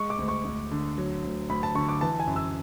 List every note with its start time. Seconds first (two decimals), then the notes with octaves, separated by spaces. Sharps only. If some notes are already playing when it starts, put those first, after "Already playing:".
Already playing: G#3 C#6
0.10 D6
0.19 D2
0.28 C#6
0.44 D2
0.71 D3
0.98 F#3
1.24 D2
1.49 D2 B5
1.63 A5
1.75 D3 C#6
1.89 D6
2.01 E3 A5
2.20 G#5
2.27 F#2
2.36 E6